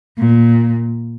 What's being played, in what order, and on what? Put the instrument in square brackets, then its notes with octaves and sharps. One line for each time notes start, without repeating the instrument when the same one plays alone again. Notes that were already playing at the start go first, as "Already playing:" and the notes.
[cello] A#2